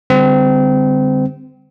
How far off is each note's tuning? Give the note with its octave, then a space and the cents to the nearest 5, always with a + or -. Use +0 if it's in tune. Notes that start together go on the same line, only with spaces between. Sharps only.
D3 +0 G3 +25 C4 -25